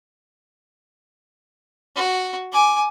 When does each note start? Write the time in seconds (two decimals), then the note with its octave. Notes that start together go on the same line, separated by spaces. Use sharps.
1.96 F#4
2.53 G#5 D6